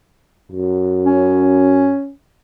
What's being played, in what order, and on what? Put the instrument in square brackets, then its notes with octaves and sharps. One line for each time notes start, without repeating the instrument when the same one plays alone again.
[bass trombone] F#2
[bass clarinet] C#4